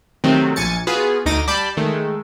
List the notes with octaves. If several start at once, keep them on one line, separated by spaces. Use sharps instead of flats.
C3 D#3 F#3 A3 C4
A#1 G#5 A6 C#7
B3 F4 F#4 G#4 B4
D2 D#4 D6 A#6 D#7
G3 D5 A5 B5 G6
D#3 G#3 A3